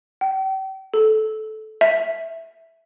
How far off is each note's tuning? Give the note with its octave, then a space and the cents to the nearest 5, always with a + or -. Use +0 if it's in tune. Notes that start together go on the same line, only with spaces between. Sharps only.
G5 -35
A4 -15
E5 +0